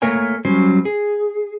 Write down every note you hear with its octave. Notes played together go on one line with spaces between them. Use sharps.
A3 A#3 A#4 C#5 G#5
F#3 G3 C#4 C5
G#4